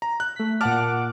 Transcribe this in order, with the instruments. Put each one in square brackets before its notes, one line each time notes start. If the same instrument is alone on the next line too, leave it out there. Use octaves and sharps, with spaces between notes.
[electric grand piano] A#5
F#6
[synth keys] A3 B6
[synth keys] A#2 F#5 D6 [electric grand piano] A5 F6